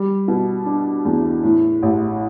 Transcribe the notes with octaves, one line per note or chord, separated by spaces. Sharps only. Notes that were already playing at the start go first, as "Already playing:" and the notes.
Already playing: G3
B2
D4
E2
A2
A1